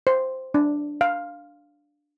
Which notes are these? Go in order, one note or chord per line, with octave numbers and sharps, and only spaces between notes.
C5
D4
F5